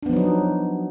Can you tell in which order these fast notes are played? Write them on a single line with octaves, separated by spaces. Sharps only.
D4 B3 F3 F#3 D#4